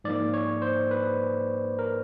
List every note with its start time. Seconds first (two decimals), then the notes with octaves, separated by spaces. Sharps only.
0.04 G#2 F3 A#3 D5
0.34 C#5
0.62 C5
0.91 B4
1.79 A#4